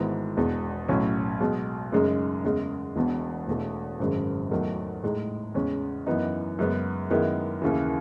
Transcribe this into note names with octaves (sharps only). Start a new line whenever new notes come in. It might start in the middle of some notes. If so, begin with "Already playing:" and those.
Already playing: G#1 G#2 E3 B3
E1 E2 B2 G#3
B1 A2 F#3 C#4
B1 B2 G#3
F#2 C#3 G#3 D#4
E2 C#3 G#3
E1 E2 B2
E1 E2 B2 A3
G#1 F#2 C#3 G#3
E2 D#3 F#3 A3
A2 G#3 D#4
E2 C#3 G#3 C#4
F#2 E3 B3 D#4
F#2 C#3 G#3 B3
F#2 D#3 G#3 B3 E4
D#2 C#3 E3